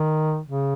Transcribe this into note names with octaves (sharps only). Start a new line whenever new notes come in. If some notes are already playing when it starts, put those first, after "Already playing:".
Already playing: D#3
C#3